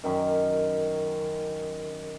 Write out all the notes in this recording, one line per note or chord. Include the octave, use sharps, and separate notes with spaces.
F#2 D#3